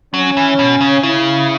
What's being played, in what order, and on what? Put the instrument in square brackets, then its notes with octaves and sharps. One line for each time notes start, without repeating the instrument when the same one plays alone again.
[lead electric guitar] F#3 [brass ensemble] C#4
[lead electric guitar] E3
B2
C#3
[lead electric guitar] C#3 [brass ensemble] E4